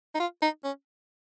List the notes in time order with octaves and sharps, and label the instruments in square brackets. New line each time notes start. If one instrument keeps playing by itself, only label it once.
[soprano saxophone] D#4
F4
D#4
C#4